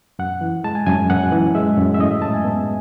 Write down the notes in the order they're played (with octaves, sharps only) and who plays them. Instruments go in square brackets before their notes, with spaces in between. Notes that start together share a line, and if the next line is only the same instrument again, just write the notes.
[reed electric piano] F#2 F#5
E3
G#3 A5
G#5
F#2 G#5
F#2 F#5
E3
G#3 E5
F#2
E5
A2 D#5
E5
G#3 A5
G#5
B3